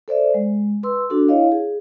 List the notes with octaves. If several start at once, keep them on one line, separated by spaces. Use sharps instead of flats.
A4 C5 D5 E5
G#3
B4 C6 E6
D4 F#4 A4
E4 C#5 D#5 F5
G#4